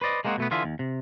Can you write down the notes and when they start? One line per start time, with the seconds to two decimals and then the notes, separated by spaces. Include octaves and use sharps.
0.01 B4 C5 D5 D#5
0.25 G#3 A#3 C4 D4 F#4 G#4
0.38 B2 A3 B3
0.51 D3 E3 F4 G#4 E5
0.64 D#2
0.79 C3